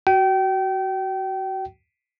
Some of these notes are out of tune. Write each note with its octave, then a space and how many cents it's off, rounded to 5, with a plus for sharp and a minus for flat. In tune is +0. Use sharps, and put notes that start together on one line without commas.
F#4 +20 G5 -30